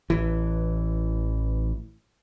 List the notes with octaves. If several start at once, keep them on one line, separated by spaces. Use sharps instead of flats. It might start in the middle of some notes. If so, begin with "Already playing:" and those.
A1 E3